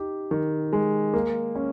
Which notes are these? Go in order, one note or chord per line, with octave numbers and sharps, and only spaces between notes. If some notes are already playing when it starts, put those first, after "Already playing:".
Already playing: D#4 G4
D#3
G#3
A#3
C#4